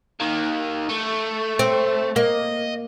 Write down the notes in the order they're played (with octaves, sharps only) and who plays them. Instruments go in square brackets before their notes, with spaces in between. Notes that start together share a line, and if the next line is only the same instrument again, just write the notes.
[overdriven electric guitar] D#3 A#3
A3
[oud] C4
[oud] A#3 [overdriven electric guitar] D#5